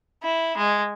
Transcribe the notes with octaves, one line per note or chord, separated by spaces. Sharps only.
E4
G#3